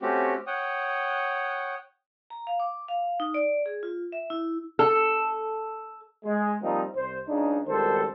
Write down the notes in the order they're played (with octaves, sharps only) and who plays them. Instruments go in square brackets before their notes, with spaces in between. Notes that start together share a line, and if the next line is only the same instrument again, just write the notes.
[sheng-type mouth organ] A3 C4 C#4 F#4 G4
C#5 F#5 G5 D#6
[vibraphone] A#5
F5
D6
F5
D#4
D5
G#4
F4
E5
E4
[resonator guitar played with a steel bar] A4
[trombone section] G#3
F3 G3 A#3 C4 D#4
C2 C5
C#2 C#3 D4 D#4
G#1 C#2 D#3 G3 A4 C5